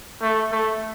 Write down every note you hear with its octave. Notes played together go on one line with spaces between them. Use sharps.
A3
A3